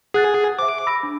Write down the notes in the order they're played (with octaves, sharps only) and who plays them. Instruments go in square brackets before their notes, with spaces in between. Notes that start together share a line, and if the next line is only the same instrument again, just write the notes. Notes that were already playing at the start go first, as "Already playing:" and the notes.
[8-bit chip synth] G#4 [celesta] F#5 F#6 A6
[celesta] C5 E5 [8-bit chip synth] D6
[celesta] B5 E6 A#6
D4